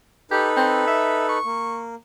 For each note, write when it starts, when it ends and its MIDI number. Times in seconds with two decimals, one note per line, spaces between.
0.31 1.38 63
0.31 0.49 67
0.31 1.38 69
0.31 1.38 71
0.57 0.84 60
0.88 1.25 76
1.29 1.81 85
1.45 1.95 58